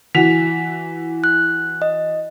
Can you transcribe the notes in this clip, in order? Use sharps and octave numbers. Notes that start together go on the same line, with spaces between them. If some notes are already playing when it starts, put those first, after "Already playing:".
E3 F#4 B6 F7
F#6
D#5